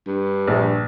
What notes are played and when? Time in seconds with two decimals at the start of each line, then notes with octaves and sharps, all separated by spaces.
0.07 G2
0.48 A#1